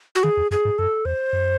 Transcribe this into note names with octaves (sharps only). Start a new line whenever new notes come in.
F#4
D#3 G#4
E2
F#2 G#4
G#2
F#2 A4
E2 C5
F#2